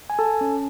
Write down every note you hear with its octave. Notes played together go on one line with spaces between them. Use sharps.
G#5
A4 A5
C#4